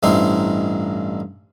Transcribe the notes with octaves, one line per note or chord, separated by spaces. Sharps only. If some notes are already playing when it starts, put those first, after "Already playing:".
A1 G2 C4 D#4 E4 C5